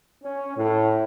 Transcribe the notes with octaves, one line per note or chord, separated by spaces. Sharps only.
C#4
A2